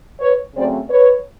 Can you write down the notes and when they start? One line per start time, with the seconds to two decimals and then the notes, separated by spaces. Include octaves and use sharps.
0.20 B4 C#5
0.55 C#3 F#3 A3 C4 C5 D5
0.90 B4 C#5